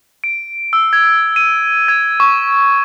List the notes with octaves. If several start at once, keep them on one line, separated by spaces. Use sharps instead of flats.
D7
E6
G#6
D#7
G#6
C#6